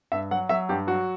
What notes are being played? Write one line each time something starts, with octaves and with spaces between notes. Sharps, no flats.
G2 E5
F#3 F#5
F#3 E5
G2 G4
F#3 F#4